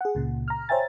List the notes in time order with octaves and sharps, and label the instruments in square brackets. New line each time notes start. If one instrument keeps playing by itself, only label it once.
[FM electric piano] G#4 F#5
C#2 A#2 C#3
A#5 F6
C5 C#5 E5 G5 G#5 A6